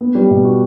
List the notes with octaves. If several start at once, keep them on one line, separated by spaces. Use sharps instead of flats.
B3
G3
B2
F#4